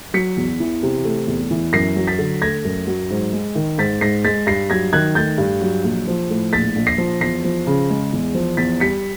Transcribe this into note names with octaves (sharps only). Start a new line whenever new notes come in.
F#3 B6 C#7
E2
E3
C3
A3
E2
E3
F#2 A#6 C7
F#3
A6 B6
D3
A3 G#6 A#6
F#2
F#3
G#2
G#3
D#3
G#2 A6 B6
G#2 A#6 C7
G#3 A6 B6
G2 A#6 C7
F#3 G#6 A#6
D#3 F#6 G#6
A3 G6 A6
G2
F#3
A#1
F3
A2
A#1 A6 B6
A#1
A#6 C7
F3
E2 A#6 C7
F3
C#3
G#3
E2
F3
E2 A6 B6
G3 B6 C#7